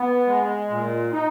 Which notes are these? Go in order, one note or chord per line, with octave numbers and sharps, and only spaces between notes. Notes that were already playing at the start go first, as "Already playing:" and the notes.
Already playing: B3
G#3
A#2
D#4